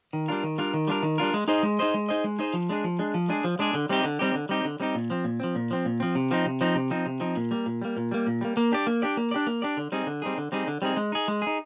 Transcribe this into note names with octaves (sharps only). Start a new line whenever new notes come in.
D#3
G3 D4 F4 A#4
D#3
G3 D4 F4 A#4
D#3
G3 D4 F4 A#4
D#3
G3 D4 F4 A#4
G#3
D#4 G#4 C5 D#5
G#3
D#4 G#4 C5 D#5
G#3
D#4 G#4 C5 D#5
G#3
D#4 G#4 C5 D#5
F3
G#3 D4 G#4
F3
G#3 D4 G#4
F3
G#3 D4 G#4
F3
G#3 D4 G#4
D3
G3 C4 D#4 G4
D3
G3 C4 D#4 G4
D3
G3 C4 D#4 G4
D3
G3 C4 D#4 G4
A#2
F3 C4
A#2
F3 C4
A#2
F3 C4
A#2
F3 C4
C3
F3 C4 D#4
C3
F3 C4 D#4
C3
F3 C4 D#4
C3
F3 C4 D#4
A#2
G3 A#3
A#2
G3 A#3
A#2
G3 A#3
A#2
G3 A#3
A#3
D4 G4 D5
A#3
D4 G4 D5
A#3
D4 G4 D5
A#3
D4 G4 D5
D3
G3 C4 D#4 G#4
D3
G3 C4 D#4 G#4
D3
G3 C4 D#4 G#4
D3
G3 C4 D#4 G#4
G#3
D#4 G#4
G#3
D#4 G#4